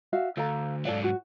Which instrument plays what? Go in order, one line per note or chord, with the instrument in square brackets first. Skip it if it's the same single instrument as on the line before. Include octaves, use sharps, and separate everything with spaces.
[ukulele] F#4 E5 F5
[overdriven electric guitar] D2 [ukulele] A4 F5 A#5
[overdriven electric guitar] G#2 F#3 [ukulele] A4 D5 F5
[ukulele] F#4